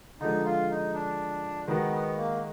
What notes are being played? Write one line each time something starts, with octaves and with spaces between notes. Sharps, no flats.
D3 F3 G#3 D#4
F4
D#4
D4
D#3 G#3 B3 D#4 F#4
B3
A#3